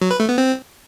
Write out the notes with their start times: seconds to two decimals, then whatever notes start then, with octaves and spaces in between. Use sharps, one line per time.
0.01 F#3
0.11 B4
0.20 A3
0.29 B3
0.38 C4